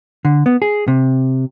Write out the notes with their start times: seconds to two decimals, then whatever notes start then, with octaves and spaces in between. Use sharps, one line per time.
0.25 D3
0.46 B3
0.62 G#4
0.88 C3